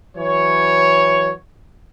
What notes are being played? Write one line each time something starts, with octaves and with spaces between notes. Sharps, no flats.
E3 F#3 C#5